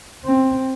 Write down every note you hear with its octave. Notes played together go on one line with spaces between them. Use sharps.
C4